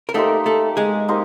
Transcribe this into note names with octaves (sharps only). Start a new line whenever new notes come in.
A#4
A3 A#3 D#4 G4 A4 C5
A3 A4
G#3 G#4
A#3 D#4 G4 C5